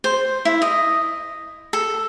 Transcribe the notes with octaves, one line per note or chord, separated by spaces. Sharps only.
C5
E4
D#5
A4